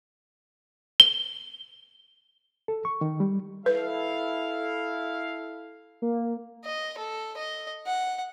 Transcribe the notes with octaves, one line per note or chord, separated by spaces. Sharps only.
G7
A4
C#6
D#3
G3
E4 A4 B4 F5
A#3
D#5
A4
D#5
F#5